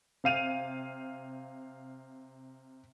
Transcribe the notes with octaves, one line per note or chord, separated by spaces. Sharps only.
C3 F5 D#7 F7